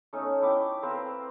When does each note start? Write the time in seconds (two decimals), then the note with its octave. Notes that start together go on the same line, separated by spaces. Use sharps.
0.13 A3 C#4 D#4
0.42 E4 G5 D6
0.82 C4 B4 F5 A#5